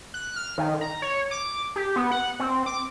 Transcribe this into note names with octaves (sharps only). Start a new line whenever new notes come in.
F#6
F6
D#3
A#5
C#5
D6
G4
B3
F#5
C4
D6